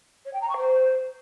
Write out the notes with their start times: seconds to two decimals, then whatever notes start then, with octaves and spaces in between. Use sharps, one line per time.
0.25 C#5
0.33 G5
0.41 A#5
0.49 C#6
0.57 C5